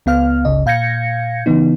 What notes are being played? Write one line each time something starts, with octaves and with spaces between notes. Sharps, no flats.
C#2 B3 F5 F6
G1 C#2 C#3 D#5
A#2 F5 G6 G#6 A#6 C#7
C#3 E3 B3 D#4